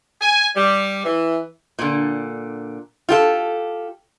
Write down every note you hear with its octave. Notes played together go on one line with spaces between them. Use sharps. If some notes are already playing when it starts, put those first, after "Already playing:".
G#5
G3
E3
A#2 D3
F4 G4 A4